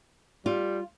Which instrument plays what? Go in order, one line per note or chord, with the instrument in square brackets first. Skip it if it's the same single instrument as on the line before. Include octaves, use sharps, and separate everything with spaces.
[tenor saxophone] G3 [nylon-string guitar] F4